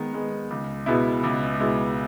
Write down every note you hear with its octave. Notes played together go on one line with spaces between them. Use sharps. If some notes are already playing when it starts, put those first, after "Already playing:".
Already playing: D#3 G#3 B3
G#3 B3
C#2
B2 G#3 B3 E4
C#2
B2 G#3 B3 E4